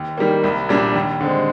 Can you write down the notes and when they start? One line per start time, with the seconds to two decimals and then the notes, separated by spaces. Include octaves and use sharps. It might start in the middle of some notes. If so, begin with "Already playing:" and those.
Already playing: D#2
0.17 D#3 G3 A#3
0.44 C2
0.69 A#2 G3 D4
0.95 D#2
1.21 D3 G#3 C4